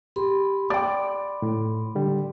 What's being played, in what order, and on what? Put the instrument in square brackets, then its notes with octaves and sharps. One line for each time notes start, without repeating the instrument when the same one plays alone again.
[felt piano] G4 [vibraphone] B5 C6
[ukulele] D5 G5 [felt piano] D6
[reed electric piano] A2
D3 G3